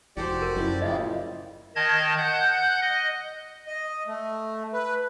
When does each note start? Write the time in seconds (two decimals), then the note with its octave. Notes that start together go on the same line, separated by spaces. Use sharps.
0.17 F1 F#4 G4 A4 C5 D5
0.42 A#4
0.56 F#2 F3 E4
0.82 A2 C#3 A#3 D#5 E5
1.76 D#3 D#5 A5 G#6
2.17 F#5 F#6 G6
2.81 D#5
3.67 D#5
4.07 A3
4.74 B4